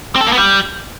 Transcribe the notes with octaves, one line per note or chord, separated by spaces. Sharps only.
C4
A4
A#3
B3
G3